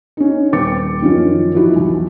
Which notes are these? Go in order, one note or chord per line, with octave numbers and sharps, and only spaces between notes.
C#4 D#4
D#1 C4 B4 D6 A6 C#7
F#2 D#3 F3 C#4 F4
E3 F3 D#4 E4 F#4
B1 E2